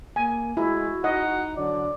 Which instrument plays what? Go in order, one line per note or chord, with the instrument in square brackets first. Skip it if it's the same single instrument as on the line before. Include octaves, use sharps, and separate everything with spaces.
[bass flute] A#3 [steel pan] G#5
[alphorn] G#3 [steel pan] E4 [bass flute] F#4
[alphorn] D#4 [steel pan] D#5 [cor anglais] F#5
[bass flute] D3 [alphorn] F#3 [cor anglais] D5